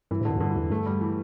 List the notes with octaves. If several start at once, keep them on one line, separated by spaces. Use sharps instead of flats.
G2 E3
A2 D3
G2
E2
G2 D3
E3
E2
G2 A3
G3
E3